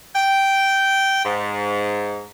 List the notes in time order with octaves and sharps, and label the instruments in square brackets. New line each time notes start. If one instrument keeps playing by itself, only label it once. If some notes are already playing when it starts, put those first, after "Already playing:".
[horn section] G5
G#2